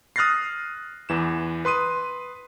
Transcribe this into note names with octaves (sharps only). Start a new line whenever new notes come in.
D#6 F6 F#6 A6 A#6 C7
E2 E3 E7
B4 C6 D#6 D#7